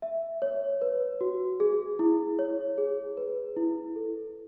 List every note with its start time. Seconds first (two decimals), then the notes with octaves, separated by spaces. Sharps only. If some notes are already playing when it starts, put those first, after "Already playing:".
0.02 E5
0.42 C#5
0.81 B4
1.21 F#4
1.60 G#4
1.99 E4
2.39 C#5
2.78 G#4
3.17 B4
3.57 E4
3.96 A4